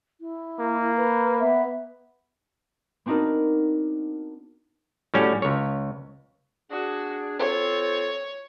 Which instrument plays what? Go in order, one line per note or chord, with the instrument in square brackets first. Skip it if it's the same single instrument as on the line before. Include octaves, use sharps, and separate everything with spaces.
[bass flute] E4
[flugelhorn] A#3
[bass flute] B4
[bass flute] B3 [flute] E5
[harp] B3 C4 D4 D#4 F#4 A#4
[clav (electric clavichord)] A2 G3 C#4 F#4
C#2 C#5
[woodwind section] D4 G#4 [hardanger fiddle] F#4
[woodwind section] C4 F4 A4 [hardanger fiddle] C#5